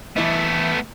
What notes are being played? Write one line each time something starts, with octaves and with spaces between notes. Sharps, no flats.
E3 A3 B3 E4 D#5